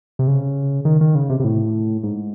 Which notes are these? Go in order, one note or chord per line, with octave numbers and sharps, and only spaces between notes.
C3
C#3
D#3
D#3
C#3
C3
C3
A2
G#2